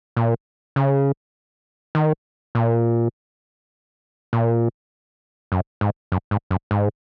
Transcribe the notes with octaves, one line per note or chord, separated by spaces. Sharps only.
A#2
C#3
D#3
A#2
A#2
F#2
G#2
F#2
G#2
F#2
G#2